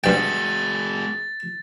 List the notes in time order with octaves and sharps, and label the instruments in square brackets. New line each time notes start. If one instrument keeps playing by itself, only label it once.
[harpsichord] G2 G5 [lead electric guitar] G#3 F#4 [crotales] A6